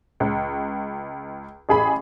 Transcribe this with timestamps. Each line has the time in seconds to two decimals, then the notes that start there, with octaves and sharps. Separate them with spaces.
0.20 C#2
1.69 A1 G#4 B5